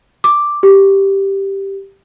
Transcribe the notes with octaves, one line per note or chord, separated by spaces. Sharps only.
D6
G4